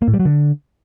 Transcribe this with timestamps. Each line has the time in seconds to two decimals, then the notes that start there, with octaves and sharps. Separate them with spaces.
0.02 A#3
0.08 A2
0.14 G3
0.20 F#3
0.25 D3